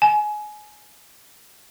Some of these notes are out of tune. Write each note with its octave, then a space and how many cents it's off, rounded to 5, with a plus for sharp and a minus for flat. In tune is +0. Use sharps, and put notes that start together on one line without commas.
G#5 +20